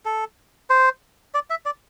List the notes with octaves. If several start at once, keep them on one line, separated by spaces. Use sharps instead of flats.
A4
C5
D5
E5
D5